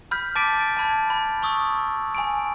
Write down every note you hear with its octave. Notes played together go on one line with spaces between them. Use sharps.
B5 F6 G6 B6
A5 D6 A6 B6 D7
A5 B5 G#6
B5
B5 C#6 D#6 E6
G#5 B5 D7